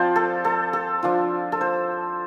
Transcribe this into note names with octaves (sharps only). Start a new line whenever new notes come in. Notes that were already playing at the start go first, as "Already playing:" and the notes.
Already playing: F3 C4 F4 C5 D5
A4
A4
A4
F3 D4 F4
A4
C5